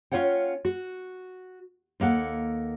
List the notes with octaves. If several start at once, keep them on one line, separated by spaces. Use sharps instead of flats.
C#4 D4 F4 C#5 F#5 G5
F#4
D#2 A#3 A4 F#5